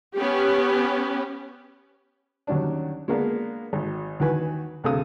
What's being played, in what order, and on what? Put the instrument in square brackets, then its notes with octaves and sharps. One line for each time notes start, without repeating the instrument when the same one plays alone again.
[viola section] B3 C#4 G4
[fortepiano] D#2 F#3 G3 C#4 D4
G#3 A#3 B3 D4
G#1
D#2 E3 F#4 B4 G#5
D2 C3 G#4 A4 F5 D#6